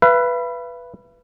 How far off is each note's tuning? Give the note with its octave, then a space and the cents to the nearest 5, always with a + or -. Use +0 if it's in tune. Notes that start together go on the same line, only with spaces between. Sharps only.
B4 +0 E5 +45